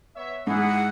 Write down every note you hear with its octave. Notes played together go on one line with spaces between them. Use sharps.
B3 C#5 E5
G#2 E4 G#4 F#5